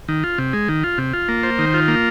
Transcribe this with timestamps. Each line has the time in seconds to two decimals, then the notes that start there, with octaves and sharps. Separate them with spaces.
0.08 D#3
0.24 F4
0.38 C3
0.53 G#3
0.68 D#3
0.84 F4
0.98 C3
1.13 F4
1.29 A#3
1.43 C5
1.59 D#3
1.74 F4
1.88 A#3